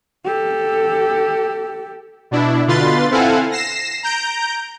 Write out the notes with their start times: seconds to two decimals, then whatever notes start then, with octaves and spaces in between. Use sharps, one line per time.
0.25 G4 A4
2.31 B2 D4 E4
2.67 B2 D3 F4 B4 C6 A6
3.11 C4 E4 A4 F5 F#5 G#5
3.52 A#6 C7 E7
4.03 A#5 G6 D7